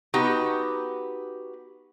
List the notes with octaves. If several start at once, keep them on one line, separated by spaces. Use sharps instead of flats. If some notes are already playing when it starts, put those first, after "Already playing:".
B3 D#4 F#4 G4